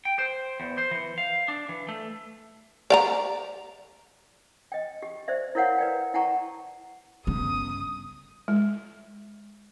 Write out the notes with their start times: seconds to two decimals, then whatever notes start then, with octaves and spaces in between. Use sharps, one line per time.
0.05 G5
0.19 C5
0.60 E2
0.78 C5
0.91 E3
1.18 F5
1.48 D4
1.69 E3
1.89 A3
2.90 D5 F5 A#5
4.72 D#5 G5
5.02 G4
5.28 C5 D5 E5
5.55 E4 A#4 C#5 F5 F#5
5.78 B4 D5 G5
6.14 E4 F#5 G5 A5 A#5 C#6
7.27 G2 C#3 B3 D#6
8.48 G#3